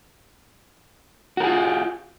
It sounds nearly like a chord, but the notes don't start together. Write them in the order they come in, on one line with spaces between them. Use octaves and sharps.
F#4 A#4 G#4 F4